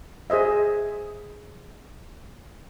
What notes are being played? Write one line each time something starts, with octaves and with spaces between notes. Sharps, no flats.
G#4 C5 D#5 E5